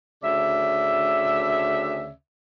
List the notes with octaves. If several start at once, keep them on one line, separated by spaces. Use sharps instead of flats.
D2 C#3 D5 E5